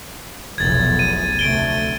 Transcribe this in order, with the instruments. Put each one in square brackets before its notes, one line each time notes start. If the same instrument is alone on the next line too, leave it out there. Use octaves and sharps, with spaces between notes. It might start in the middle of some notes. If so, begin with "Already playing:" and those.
[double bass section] F1 B1 E2 [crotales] G#6 A6
[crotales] D#7
[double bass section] D2 C3 A3 [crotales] D7 G7